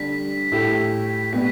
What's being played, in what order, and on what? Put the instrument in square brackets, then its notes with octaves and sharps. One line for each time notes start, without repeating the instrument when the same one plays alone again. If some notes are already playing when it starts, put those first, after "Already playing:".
Already playing: [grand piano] D3 G3 D4 [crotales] B6
[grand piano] A2 A3 E4 G4
[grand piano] B2 G3 B3 G4 [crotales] B6